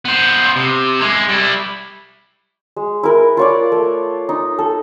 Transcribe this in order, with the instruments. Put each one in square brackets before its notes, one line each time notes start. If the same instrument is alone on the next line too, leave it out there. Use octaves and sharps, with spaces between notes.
[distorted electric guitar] B3 C5
C3
G#3 E4
G3 E4
[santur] G#3
E4 A#4 B4
F4 C#5 D5
A3
D#4
A4